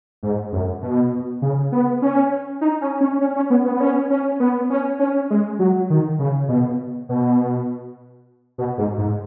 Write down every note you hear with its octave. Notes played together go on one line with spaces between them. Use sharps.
G#2
F#2
B2
C#3
B3
C#4
D#4
C#4
C#4
C#4
C#4
B3
B3
B3
C#4
C#4
B3
C#4
C#4
G#3
F#3
D#3
C#3
B2
B2
B2
G#2
G#2